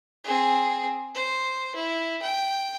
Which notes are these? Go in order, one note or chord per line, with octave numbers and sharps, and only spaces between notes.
C4 G#4
C5
E4
G5